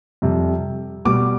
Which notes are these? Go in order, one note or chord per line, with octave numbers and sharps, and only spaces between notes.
F2 C3 G3
B2 G3 D6